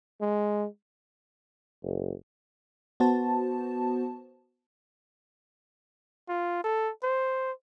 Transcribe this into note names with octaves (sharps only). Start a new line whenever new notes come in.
G#3
F#1
B3 F#4 C5 A5
F4
A4
C5